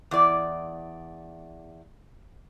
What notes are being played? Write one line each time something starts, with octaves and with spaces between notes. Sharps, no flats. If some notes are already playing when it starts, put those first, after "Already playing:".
E2 D5